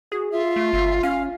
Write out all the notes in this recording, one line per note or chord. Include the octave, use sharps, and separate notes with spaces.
F#4 G#4
F4 E5
A3
G1 E5
C#4 F5